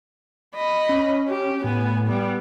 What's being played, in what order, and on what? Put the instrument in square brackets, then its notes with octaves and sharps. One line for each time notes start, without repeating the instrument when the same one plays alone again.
[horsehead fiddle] D#5 B5
[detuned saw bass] C#4
[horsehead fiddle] G4
[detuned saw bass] A2 [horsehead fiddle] B3 G#5
[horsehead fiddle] G3 B3